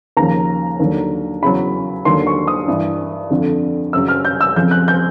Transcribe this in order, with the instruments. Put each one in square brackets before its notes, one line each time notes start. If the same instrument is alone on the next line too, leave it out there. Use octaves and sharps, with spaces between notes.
[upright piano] D#2 C#3 F3 A#5
D#2 D3 F#3
E2 C#3 F#3 B5
D#2 D3 F#3 C6
C#6
D#6
G2 E3
F2 D3 F3
F#2 C#3 F#3 E6
F6
G6
E6
F2 C#3 F3 G6
F#6
G6